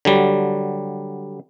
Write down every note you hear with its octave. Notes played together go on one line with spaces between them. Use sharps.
D3 F#3 G3